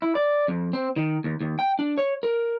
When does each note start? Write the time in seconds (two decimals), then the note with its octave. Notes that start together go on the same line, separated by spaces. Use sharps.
0.02 E4
0.15 D5
0.48 F2
0.73 C4
0.96 D#3
1.24 D#2
1.41 D#2
1.59 G5
1.79 D4
1.98 C#5
2.23 A#4